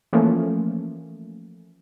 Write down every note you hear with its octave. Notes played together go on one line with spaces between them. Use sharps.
E3 F3 A3 A#3 C#4